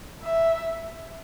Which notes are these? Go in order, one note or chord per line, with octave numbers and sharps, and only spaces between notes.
E5